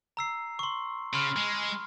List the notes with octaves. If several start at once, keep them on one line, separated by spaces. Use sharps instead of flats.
A#5 E6 C7
C6 C#6
C#3 B5 C6 F6
G#3